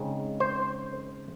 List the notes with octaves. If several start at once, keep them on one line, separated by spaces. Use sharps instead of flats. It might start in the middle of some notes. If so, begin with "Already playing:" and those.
Already playing: C#3 G#3 C4 D#4
C5